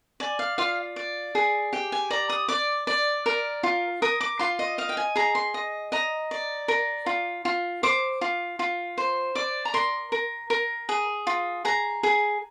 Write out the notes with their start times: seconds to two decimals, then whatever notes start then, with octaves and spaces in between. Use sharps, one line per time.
0.20 D5 G#5
0.39 F5
0.58 F4 F5
0.96 D5
1.35 G#4
1.73 G4 G5
1.92 G#5
2.10 D5 A#5
2.29 D#6
2.48 D5 D6
2.87 D5
3.26 A#4
3.63 F4
4.02 A#4 D#6
4.21 D6
4.39 F4 C6
4.59 D#5
4.78 D#5 F5
4.89 G5
4.97 G#5
5.16 G#4 A#5
5.35 C6
5.54 D#5
5.92 D#5 A#5
6.31 D5
6.68 A#4
7.06 F4
7.45 F4
7.83 C5 D6
8.21 F4
8.59 F4
8.98 C5
9.35 D5 D6
9.65 A#5
9.74 A#4 C6
10.12 A#4
10.50 A#4
10.89 G#4
11.27 F4
11.65 G#4 A#5
12.03 G#4